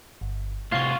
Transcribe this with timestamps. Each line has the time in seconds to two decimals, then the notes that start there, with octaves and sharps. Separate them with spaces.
0.21 G1
0.72 A2 C3 F4 F#4 F5 C#6 F6 G#6